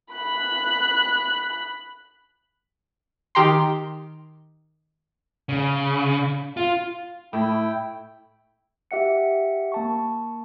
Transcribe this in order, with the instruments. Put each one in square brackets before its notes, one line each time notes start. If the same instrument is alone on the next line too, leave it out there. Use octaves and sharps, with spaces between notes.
[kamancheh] B5 F#6
[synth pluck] D#3 G4 G5 A#5 C6
[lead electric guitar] C#3
F4
[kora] A2 [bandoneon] E4 G5
[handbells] G4 E5 F#5 C#7
A#3 A5 C#6